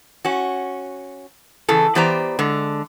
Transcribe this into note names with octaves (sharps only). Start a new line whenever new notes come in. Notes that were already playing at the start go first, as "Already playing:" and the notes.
C#4 F#4
C#3 E3 G#4 A4
E3 B3 G4 C5 D5 A#5
D3 G#3